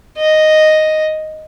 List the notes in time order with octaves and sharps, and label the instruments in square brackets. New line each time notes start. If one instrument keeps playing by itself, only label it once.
[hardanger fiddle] D#5